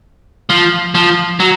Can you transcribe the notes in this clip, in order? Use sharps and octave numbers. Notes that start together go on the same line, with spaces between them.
F3
F3
F#3